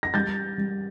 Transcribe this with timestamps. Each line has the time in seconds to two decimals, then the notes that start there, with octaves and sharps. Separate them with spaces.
0.03 A#6
0.14 G3 G6 A6
0.58 G3